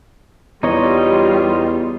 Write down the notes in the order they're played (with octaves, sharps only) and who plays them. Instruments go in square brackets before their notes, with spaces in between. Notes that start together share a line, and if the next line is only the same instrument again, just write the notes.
[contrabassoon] E2 [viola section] G3 F4 [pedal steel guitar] D#4 C#5 D#5